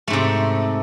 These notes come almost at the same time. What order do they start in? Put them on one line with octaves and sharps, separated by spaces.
A3 G#2 C3